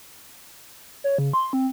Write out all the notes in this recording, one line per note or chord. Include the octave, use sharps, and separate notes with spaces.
C#5
C#3
C6
C4